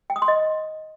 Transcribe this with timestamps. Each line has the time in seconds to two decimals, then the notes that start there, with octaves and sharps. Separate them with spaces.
0.10 G5
0.16 D#6
0.22 C6
0.28 D#5